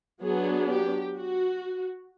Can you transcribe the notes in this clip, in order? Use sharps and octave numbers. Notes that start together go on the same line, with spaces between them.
F#3 B3 D4 G#4
G4
F#4